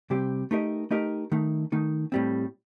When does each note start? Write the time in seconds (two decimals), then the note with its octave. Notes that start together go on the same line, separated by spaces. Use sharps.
0.10 C3 G3 C4 G4
0.51 A3 D#4 G4 A#4 D#5
0.91 A3 D#4 G4 A#4 D#5
1.32 D#3 A3 D#4
1.72 D#3 A3 D#4
2.12 A2 G3 C4